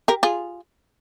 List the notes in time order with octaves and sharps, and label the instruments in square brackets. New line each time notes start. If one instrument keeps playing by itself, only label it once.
[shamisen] G4 A#4
F4 G#4